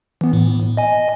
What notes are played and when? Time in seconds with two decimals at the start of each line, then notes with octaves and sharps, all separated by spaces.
0.21 E3 B3
0.33 A2
0.77 D#5 G#5